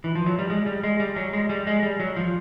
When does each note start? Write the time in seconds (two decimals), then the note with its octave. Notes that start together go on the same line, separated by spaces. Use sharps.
0.04 E3
0.15 F3
0.26 F#3
0.39 G3
0.50 G#3
0.66 G3
0.84 G#3
1.00 G3
1.16 F#3
1.33 G#3
1.49 G3
1.67 G#3
1.83 G3
2.00 F#3
2.16 F3